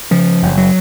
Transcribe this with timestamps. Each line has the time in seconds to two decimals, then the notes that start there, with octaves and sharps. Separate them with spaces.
0.11 C#3 F3
0.42 F#1
0.57 F#3